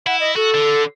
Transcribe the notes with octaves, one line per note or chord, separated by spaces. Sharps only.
E4 F#5
D#5
F#4 A4
D3